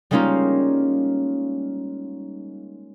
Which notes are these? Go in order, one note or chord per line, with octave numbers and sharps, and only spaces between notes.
G3 G#3 A#3 C#4 D#4 F4